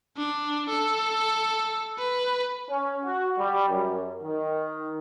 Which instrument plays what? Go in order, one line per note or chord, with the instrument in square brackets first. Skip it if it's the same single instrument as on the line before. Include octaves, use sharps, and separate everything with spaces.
[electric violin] D4
A4
B4
[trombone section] C#4
F#4
G3
F#2
D#3